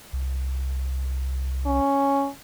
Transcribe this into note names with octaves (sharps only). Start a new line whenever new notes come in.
C2
C#4